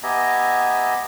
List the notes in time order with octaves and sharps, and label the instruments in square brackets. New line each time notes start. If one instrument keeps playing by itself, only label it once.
[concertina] B3 G4 D#5 E5 G#5 A#5